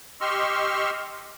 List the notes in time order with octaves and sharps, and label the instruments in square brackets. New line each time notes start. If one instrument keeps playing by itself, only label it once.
[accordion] G4 D#5 C6 C#6 E6 F6